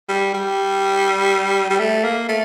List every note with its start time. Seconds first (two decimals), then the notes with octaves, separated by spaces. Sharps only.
0.09 G3
0.34 G3
1.70 G3
1.79 A3
2.04 A#3
2.29 A3